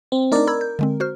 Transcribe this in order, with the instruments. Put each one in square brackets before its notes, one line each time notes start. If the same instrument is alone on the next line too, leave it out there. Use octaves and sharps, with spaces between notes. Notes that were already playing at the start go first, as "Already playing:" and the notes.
[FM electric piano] C4
[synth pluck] A3 D4 [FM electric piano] D#4 A#4 D5
[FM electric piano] A#4 [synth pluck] B5 E6 G#6
[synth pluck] G6
D3 G#3 C4
F#4 C5 F6